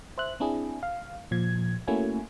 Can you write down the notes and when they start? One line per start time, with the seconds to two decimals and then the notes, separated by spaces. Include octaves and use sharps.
0.18 C5 E5 F#6
0.40 C4 D4 E4 G#4
0.83 F5
1.31 A#2 F3 G#6
1.88 A3 A#3 C#4 E4 F#4 G#5